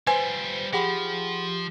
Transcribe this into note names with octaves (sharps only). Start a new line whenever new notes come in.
G3 F4 B4 C5 G#5
F3 G4 G#4 F#5 B5